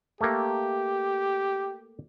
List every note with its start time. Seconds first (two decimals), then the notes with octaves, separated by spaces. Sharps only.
0.21 A3 A#3 G4